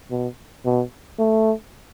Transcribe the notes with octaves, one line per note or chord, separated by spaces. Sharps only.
B2
B2
A3